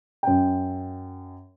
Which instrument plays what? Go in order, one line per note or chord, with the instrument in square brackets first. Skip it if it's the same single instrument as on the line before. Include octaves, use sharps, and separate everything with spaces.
[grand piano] F#2 G5